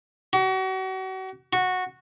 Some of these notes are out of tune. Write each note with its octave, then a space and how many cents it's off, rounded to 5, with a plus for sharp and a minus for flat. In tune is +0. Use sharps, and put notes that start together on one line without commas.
F#4 +35
F#4 -10